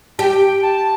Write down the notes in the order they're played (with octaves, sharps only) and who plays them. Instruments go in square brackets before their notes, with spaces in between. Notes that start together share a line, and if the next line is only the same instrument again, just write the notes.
[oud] G4 [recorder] G5 A5
[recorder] A5